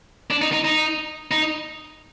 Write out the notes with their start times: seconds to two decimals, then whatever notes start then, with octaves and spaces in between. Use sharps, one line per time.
0.30 D4
0.42 D#4
0.52 D#4
0.65 D#4
1.31 D#4